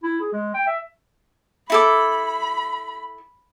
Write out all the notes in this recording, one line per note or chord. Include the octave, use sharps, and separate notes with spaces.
E4
G#4
G#3
G5
E5
E4 A4 B5 D6